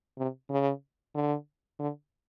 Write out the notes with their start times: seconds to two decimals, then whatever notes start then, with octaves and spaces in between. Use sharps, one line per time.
0.18 C3
0.50 C#3
1.14 D3
1.79 D3